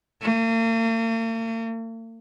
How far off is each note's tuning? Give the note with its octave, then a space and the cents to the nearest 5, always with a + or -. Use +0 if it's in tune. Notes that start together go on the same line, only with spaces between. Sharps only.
A#3 -45